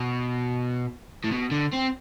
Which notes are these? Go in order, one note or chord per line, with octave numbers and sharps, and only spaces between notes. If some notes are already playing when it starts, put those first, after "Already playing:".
Already playing: B2
A2
B2
D3
C4